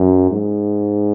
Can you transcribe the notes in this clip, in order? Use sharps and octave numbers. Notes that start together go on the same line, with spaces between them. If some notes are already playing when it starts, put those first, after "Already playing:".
Already playing: F#2
G#2